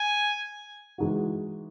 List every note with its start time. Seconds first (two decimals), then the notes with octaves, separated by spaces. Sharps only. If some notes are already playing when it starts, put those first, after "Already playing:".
Already playing: G#5
0.98 E3 G#3 D#4 F#4